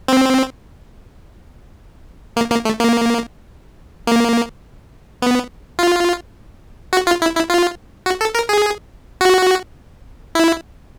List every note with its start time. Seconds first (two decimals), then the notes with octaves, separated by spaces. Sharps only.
0.08 C4
2.36 A#3
2.51 A#3
2.65 A3
2.80 A#3
4.07 A#3
5.22 B3
5.79 F4
6.93 F#4
7.07 F4
7.22 E4
7.36 E4
7.50 F4
8.06 F#4
8.21 A4
8.35 A#4
8.49 G#4
9.21 F#4
10.35 E4